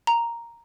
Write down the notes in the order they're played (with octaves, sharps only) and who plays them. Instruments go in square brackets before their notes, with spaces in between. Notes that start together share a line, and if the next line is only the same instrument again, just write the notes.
[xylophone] A#5